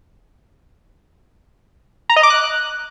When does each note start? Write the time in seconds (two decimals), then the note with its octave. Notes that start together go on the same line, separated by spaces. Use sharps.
2.10 A#5
2.16 D#5
2.23 D6
2.30 F#6